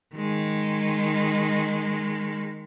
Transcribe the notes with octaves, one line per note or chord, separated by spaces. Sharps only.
D#3 G#3